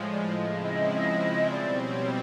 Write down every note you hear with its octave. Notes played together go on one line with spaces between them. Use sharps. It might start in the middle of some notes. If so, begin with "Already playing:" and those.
Already playing: A2 F3 G#3
D5
C#3 F3 G#3 C4 E4 D#5
D#5
D#5
B2 G3 C4 D5
C#5